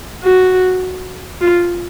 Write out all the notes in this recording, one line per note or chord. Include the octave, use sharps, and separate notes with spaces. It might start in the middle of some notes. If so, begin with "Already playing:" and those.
F#4
F4